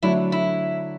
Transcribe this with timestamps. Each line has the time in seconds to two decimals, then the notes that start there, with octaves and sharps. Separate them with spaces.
0.03 D3 F#3 A3 D4 E4
0.32 E4